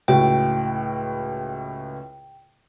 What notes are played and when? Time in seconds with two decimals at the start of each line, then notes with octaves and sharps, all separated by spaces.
0.08 C#2 A2 F#4 G5